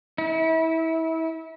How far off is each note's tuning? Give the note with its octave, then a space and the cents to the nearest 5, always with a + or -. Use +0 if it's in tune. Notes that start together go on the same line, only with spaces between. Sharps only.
E4 -30